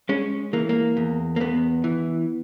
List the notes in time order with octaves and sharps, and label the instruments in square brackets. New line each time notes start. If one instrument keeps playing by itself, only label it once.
[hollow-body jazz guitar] G#3 C#4
E3 A#3
A#3
E2
A#3
E2 B3
E3